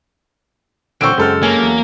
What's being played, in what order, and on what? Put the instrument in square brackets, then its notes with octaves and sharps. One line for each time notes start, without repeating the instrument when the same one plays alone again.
[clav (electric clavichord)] A#2 D3 E3 [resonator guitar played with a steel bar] F#3 C4 [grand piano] C#6 E6 D7
[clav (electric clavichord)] F#2 C#3 [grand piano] G#3 A4 F6
[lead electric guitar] A#3 [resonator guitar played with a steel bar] C#4
[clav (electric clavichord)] E2 F#3